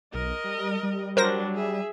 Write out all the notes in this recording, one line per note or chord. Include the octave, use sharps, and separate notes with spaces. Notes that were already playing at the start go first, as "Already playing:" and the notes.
B1 A#4 D#5
G3
G3
F#3 D4 A#4 C5 A#6
G#4 E5